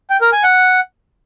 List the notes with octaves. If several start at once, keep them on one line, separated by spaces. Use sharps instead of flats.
G5
A#4
G#5
F#5